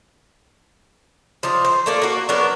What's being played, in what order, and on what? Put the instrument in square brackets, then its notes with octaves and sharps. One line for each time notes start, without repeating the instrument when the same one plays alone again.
[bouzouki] F3 D4 D#4
C5
A3 A#3 D5
A#3 F#4
F#3 B3 D4 A#4